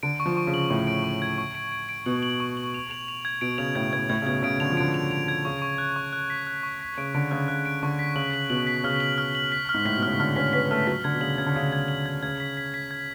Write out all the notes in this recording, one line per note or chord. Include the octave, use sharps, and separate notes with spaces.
D3 D7
C#6
F3
C#6
C#3
F#7
A2 C#6
D7
C#6
G#6
C#6
D7
D7
D7
B2 F#7
F#7
C#6
F#7
F7
F7
F7
G#6
B2 D7
C#3 F7
A2 G#6
A2 G#6
A2 G#6
C#3
B2 G#6
C#3 D7
D3 F7
F3
D3 D7
F7
F7
G#6
C#3 C#6
C#6
F#6
C#6
F#6
B6
F#6
C#6
B6
C#3 D7
D3 D7
C#3 F#6
C#3 F#6
D7
D3 C#6
B6
C#3 F#7
F#7
B2 F#7
B6
C#3 F6
F#7
F6
F#7
B6
F6
G#2
A2 B6
B2
C#3 F6
D3 F6
C#4 B6
B3 B6
A3 F6
F#3 B6
D3 G#6
B2
C#3 F#7
C#3 G#6
D3
C#3 G#6
G#6
F#7
G#6
C#3 G#6
B6
B6
B6
G#6